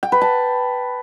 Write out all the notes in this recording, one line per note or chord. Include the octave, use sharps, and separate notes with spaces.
G5
B4
A5